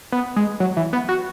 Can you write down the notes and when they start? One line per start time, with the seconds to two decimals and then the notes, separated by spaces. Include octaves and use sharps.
0.12 B3
0.36 G#3
0.60 F#3
0.77 E3
0.93 B3
1.09 F#4